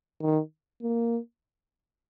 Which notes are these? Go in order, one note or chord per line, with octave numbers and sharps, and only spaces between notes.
D#3
A#3